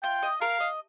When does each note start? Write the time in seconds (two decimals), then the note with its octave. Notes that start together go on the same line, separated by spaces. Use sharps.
0.03 F4 G5
0.23 D#5
0.41 A#4 F5
0.60 D#5